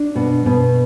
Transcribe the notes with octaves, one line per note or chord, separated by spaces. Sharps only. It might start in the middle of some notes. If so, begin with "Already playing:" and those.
Already playing: D4
B2
B2